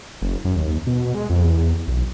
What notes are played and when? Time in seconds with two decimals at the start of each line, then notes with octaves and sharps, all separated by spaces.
0.22 F#1
0.45 F#2
0.56 D#2
0.87 B2
1.14 G#3
1.30 F2
1.44 E2
1.88 B1